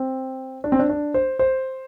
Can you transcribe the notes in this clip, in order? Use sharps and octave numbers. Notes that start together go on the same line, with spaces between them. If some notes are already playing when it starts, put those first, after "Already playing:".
Already playing: C4
D4
C4
D4
D4
C5
C5